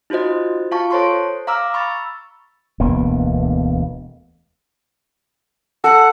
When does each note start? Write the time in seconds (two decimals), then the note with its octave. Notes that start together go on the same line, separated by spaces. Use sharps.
0.10 D#4 F4 F#4 C5 D#5
0.72 F4 F5 A5 C#6
0.91 A4 C5 C#5 A5 C6 C#6
1.47 F5 A#5 D6 E6 F6
1.74 B5 C#6 E6 A6
2.80 E1 D2 A#3 B3
5.84 A4 F#5